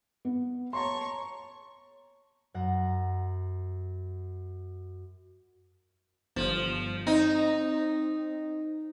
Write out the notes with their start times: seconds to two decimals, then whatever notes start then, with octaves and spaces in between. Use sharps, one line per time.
0.25 B3
0.73 C#5 A5 A#5 C6 C#6
2.54 F#2 F#5 A#5
6.36 G1 F3
7.07 C4 D#4